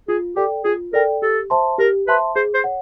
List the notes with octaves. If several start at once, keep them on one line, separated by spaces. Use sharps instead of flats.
F4 G#4
G4 A4 D5 G5
F4 G#4
A4 A#4 D5 G5
G4 A4
C5 E5 A5 C6
G4 A#4
B4 C5 E5 A5 C6
G#4 C5
C5
C#5 F#5